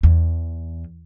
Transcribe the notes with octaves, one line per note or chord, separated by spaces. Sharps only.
E2